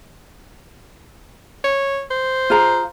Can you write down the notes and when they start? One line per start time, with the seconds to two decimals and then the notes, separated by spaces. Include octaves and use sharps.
1.64 C#5
2.11 C5
2.50 F4 G#4 A#5